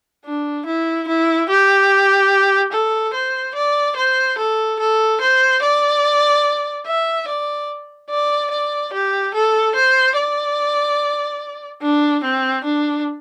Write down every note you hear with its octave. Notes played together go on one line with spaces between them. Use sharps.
D4
E4
E4
G4
A4
C5
D5
C5
A4
A4
C5
D5
E5
D5
D5
D5
G4
A4
C5
D5
D4
C4
D4